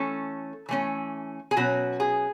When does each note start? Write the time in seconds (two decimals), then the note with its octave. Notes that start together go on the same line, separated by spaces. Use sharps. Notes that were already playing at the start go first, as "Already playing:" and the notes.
Already playing: E3 A3 C#4 A4
0.69 E3 A3 C#4
1.51 G#4
1.56 B2 F#3 C#4 F#4
2.00 G#4